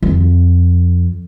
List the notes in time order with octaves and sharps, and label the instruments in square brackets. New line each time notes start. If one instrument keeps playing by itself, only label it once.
[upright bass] F2